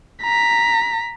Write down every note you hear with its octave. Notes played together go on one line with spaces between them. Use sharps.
A#5 B6